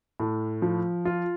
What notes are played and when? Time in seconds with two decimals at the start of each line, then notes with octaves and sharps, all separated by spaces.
0.20 A2
0.62 F3
1.05 F4